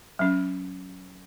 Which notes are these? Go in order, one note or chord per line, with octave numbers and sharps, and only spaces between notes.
F#3 C#4